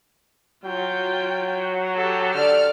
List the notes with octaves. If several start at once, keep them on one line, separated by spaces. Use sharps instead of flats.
F#3 F4 G5
G4 A4
D3 D5 F6